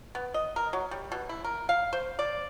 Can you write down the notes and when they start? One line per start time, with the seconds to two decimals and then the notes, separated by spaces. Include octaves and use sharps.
0.15 B3
0.34 D#5
0.56 A#4
0.73 F#3
0.91 G3
1.12 B2
1.29 E4
1.44 A#4
1.69 F5
1.93 C5
2.19 D5